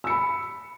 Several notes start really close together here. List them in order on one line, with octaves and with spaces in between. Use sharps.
E6 C#7 B5